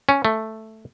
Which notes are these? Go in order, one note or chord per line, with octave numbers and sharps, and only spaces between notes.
C#4
A3